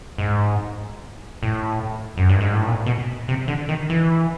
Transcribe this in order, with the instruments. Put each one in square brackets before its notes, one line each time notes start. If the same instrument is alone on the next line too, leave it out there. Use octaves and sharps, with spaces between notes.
[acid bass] G#2
A2
F#2
G2
G#2
A2
A#2
B2
C3
D3
D#3
E3